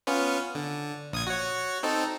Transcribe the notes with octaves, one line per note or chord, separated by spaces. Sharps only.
B3 C#4 F4
D3
A#1 D#6 G#6
F#4 C#5
C4 D#4 A4